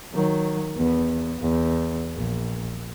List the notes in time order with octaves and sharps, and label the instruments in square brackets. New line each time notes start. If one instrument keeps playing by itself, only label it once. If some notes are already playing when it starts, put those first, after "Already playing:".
[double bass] D#3 F#3
E2 B3
E2
A#1